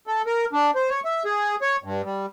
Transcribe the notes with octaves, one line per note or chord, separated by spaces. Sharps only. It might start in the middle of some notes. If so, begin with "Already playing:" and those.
A4
A#4
D4
C5
C#5
E5
G#4
C#5
G2
G3